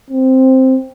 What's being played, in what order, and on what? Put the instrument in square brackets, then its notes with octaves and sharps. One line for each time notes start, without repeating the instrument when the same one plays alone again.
[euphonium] C4